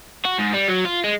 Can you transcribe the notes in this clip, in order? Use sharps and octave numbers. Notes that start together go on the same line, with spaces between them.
F#4
G#2
G3
F#3
F4
G#3